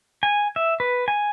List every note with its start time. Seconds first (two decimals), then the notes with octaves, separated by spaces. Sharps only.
0.23 G#5
0.56 E5
0.80 B4
1.08 G#5